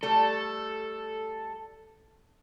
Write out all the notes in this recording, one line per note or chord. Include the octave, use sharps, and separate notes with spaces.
G3 A3 A4